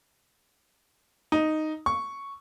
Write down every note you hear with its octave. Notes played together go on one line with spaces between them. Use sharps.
D#4
C#6